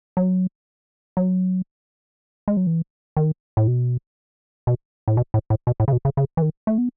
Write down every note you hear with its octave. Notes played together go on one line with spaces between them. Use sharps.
F#3
F#3
G#3
F#3
E3
D#3
A2
B2
B2
A2
B2
A2
A2
B2
A2
C#3
B2
C#3
C#3
E3
D#3
A3
B3